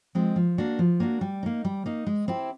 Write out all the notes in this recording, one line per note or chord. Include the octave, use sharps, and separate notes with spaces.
F3 G#3 C4
F3
A#3 D4 F#4
F3
A#3 D4 F#4
G3
A#3 D#4
G3
A#3 D#4
G#3
C4 E4 G4